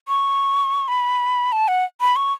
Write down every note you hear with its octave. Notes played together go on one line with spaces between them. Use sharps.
C#6
B5
A5
F#5
B5
C#6